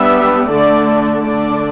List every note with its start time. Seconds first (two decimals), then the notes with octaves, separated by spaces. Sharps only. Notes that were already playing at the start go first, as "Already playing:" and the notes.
Already playing: G3 B3 D4 E5
0.49 D3 A3 D4 D5
1.21 D3 A3 D4 D5